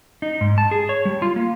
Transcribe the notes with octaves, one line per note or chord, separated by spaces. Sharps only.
D#4
G#2
A5
G#4
C#5
G3
F4
A#3